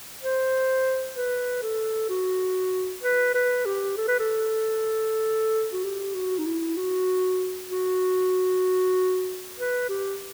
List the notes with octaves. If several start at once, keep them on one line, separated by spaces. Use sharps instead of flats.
C5
B4
A4
F#4
B4
B4
G4
A4
B4
A4
F#4
G4
F#4
D#4
E4
F#4
F#4
B4
G4